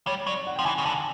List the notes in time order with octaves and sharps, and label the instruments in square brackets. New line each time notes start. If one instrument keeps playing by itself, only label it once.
[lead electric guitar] G3 [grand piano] C#5
[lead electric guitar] F#3 [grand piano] D5
[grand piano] F#5
[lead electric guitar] F3 [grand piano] G5
[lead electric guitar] E3 [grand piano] G#5
[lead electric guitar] C#3
[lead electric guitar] D3 [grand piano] A5